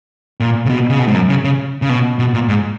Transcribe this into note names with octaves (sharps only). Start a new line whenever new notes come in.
A#2
C#3
B2
C#3
B2
G#2
F#2
C#3
C#3
C#3
B2
B2
A#2
G#2